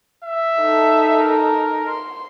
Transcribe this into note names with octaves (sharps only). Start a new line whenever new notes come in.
E5
D#4 A4
A#4
C6